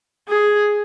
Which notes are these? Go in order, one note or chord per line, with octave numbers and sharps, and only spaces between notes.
G#4